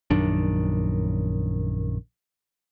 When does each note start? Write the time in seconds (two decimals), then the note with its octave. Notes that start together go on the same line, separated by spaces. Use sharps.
0.10 A#1 F#2 D#3 D4